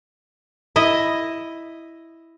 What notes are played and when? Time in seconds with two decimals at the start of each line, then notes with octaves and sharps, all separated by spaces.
0.76 E4 D#5